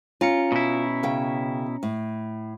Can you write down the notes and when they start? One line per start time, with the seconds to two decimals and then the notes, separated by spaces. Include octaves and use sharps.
0.21 C#4 F4 A#5 C#7
0.52 B2 E4
1.03 C#3 G5
1.83 A2